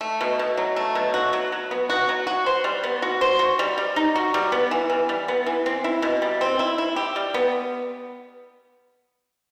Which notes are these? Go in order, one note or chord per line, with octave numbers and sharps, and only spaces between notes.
A3
B2
B2
F#3
A3
B2
F#4
F#3
F#3
B3
F#4
F#3
F#4
C5
G3
B3
F#4
C5
F#4
G3
G3
D#4
F#4
G3
B3
E3
E3
G3
B3
E3
C4
E4
B2
G3
C4
E4
E4
G4
G3
B3